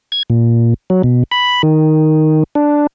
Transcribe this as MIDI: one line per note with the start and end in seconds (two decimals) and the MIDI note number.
0.12 0.23 92
0.30 0.74 46
0.90 1.02 54
1.03 1.23 47
1.31 1.62 83
1.63 2.43 51
2.55 2.87 62